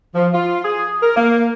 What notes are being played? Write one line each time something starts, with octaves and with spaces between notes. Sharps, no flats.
F3
F4
G#4
A#4
A#3